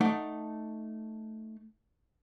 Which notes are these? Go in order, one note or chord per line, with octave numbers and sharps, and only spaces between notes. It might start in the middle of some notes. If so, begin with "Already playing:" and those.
A3 D#4 D5 F#5